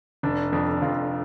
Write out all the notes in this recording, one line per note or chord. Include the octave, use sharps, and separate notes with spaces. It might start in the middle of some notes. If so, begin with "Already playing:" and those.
F1 D4
F2 D4
F2 F4